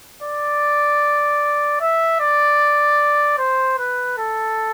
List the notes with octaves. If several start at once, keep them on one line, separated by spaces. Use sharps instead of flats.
D5
E5
D5
C5
B4
A4